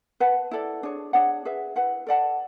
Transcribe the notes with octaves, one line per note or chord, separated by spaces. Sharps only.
B4 F#5 A5
E4 A4 D5
D4 G#4 C#5
D4 G#4 C#5 F#5
G#4 B4 E5
E4 B4 F#5
A4 D5 F#5 A5